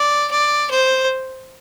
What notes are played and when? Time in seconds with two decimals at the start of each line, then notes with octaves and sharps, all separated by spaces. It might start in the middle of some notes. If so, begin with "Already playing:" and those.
Already playing: D5
0.31 D5
0.71 C5